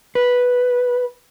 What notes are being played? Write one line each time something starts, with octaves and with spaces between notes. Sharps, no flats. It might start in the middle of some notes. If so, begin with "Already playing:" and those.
B4